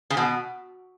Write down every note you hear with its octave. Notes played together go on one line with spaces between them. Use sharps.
C#3
B2